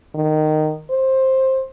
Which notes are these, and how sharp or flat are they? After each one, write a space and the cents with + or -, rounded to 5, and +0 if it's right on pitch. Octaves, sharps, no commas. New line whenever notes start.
D#3 -15
C5 +15